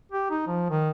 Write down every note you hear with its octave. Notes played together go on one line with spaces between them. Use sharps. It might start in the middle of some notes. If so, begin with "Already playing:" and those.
G4
D#4
F3
D#3